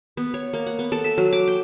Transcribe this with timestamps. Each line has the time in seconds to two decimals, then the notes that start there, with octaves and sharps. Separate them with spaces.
0.17 B3
0.34 C#5
0.53 A#3
0.67 F#5
0.79 B3
0.92 A4
1.04 E5
1.18 F#3
1.33 D6
1.48 G5